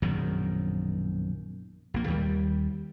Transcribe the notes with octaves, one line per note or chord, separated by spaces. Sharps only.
A#1 F#2 B2 D#3
A#1 A#3
D#2 G3